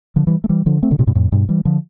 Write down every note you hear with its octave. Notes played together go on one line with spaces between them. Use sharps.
D3 F3
E3 G3
A3
E3 G3
D3 F3
A3 C4
B2 D3
A2 C3
G2 B2
F2 A2
G2 B2
E3 G3
D3 F3